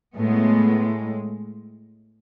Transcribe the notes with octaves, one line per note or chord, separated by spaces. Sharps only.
A2 G#3 B3